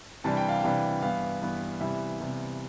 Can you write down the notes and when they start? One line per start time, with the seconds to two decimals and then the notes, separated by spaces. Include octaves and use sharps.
0.24 C3 E3 G3 D4 A5
0.37 G5
0.49 F5
0.61 C3 E3 G3 D4 G5
1.02 G2 E3 B3 F5
1.42 G2 E3 B3
1.80 C3 E3 G3 B3 E5
2.19 C3 E3 G3 B3